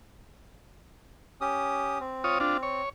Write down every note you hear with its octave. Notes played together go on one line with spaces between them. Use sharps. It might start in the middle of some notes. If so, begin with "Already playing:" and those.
C#4 G4 D#6
C4
F4 C#5 D#6
D4 F4
C#5